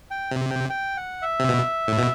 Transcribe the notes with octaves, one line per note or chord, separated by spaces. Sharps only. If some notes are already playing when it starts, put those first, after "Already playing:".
G5
C3
G5
G5
F#5
E5
C3
B2
A2
B2